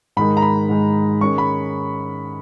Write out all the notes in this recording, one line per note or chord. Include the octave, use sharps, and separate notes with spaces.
G#2 D#3 G#3 D#4 B5
A#5
B5
G#2 D#3 G#3 D#4
D#3 G#3 C#4 C#6
B5